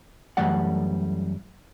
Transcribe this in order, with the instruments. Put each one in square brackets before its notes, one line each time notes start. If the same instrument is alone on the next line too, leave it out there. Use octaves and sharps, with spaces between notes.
[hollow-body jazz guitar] F#2 E3 G3 A3 D5 F#5